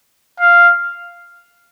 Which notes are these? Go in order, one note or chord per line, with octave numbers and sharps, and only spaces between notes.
F5